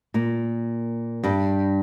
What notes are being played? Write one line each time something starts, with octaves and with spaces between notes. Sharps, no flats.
A#2 A#3
G2 G3